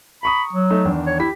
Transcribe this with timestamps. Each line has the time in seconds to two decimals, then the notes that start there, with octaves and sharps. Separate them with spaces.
0.23 A#5 B5 C#6 D#6
0.53 F#3
0.70 A3 D#4
0.85 E2 D#3 D4
1.07 C#5
1.19 E4 G4 B6